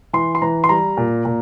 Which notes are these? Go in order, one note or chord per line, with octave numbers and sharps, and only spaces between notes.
E3 C6
C6
E3 A#5
C6
G3 A#5
A#2
A#2